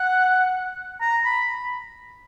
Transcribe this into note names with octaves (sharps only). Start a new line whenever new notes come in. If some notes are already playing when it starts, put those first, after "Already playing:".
Already playing: F#5
A#5
B5